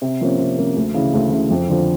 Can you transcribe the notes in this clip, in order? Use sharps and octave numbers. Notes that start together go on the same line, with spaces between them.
C3
F3 A#3 C#4
C3
F3 A#3 C#4
D2
C#3 E3
D2
C#3 E3
F2
D3 F3